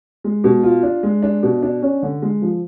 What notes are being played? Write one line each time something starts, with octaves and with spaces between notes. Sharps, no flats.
G#3
B2
F4
D4
G#3
D4
B2
D4
C#4
D3
G#3
F3